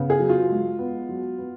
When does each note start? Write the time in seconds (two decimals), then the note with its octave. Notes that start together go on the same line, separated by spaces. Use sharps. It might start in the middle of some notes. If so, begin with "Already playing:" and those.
Already playing: C#3 B3
0.10 G#4
0.20 F#3
0.29 F4
0.50 G#3
0.79 B3
1.09 F#3
1.38 B3